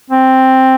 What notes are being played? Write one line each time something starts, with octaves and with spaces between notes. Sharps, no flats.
C4